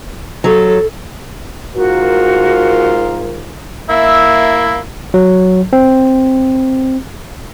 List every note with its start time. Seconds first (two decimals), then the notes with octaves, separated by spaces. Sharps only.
0.44 F#3 A4
1.75 G#2 F4 F#4 A#4
3.89 A#3 E4 E5
5.14 F#3
5.73 C4